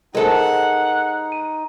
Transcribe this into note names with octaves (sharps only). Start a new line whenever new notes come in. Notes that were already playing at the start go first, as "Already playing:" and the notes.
G#3 D#4 A4 A#4 C5 D#5 F#5
D#7